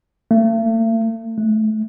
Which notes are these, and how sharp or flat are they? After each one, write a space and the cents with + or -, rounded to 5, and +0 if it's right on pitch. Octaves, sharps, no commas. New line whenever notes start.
A3 +45
A3 -20